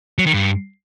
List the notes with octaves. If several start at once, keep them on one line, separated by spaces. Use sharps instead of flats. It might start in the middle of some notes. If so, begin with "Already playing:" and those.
F#3
D#3
G2